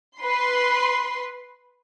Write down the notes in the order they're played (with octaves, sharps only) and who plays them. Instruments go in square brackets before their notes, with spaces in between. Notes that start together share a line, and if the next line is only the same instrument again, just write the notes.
[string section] B4 C6